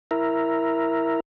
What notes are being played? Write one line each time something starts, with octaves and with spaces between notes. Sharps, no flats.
E4 A#4